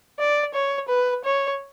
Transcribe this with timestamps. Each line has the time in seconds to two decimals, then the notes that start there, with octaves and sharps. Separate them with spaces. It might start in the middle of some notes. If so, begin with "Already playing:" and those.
0.19 D5
0.54 C#5
0.89 B4
1.25 C#5